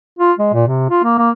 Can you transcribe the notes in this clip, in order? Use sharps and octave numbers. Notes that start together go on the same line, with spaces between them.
F4
G#3
A#2
C3
F4
A#3
A#3